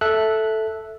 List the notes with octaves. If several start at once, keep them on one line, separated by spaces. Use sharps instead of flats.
A4 E5 F#6